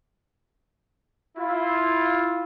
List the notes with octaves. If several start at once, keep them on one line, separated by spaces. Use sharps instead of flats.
E4 F4